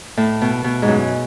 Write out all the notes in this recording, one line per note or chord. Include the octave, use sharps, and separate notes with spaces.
A2
B2
B2
G#2
F#2